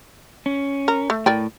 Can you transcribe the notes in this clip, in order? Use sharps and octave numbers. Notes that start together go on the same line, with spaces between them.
C#4
A#4
A3
A2 A#4 D5 G5